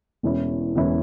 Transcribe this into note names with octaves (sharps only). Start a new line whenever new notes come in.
E1 E2 E3 C#4 E4
E1 E2 E3 C#4 E4